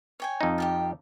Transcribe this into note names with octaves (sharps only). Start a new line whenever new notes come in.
C#5 G5 G#5
F2 D#4
F4 G4 G5